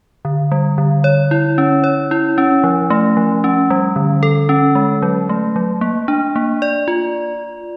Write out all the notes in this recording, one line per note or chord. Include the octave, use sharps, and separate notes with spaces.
D3
G3
D3
C#5
E4
C#4
C#5
E4
C#4
F3
A3
F3
C#4
G3
D3
A4
C#4
G#3
F#3
A3
F#3
A#3
D4
A#3
D5
F4